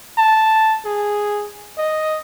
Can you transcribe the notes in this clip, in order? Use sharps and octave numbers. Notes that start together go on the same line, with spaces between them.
A5
G#4
D#5